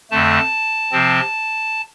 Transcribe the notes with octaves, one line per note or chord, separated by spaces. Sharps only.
F2 D3 A3 A5
C3 F3 C4